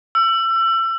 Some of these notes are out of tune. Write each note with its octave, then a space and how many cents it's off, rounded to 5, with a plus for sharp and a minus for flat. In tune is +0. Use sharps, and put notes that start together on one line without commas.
E6 +30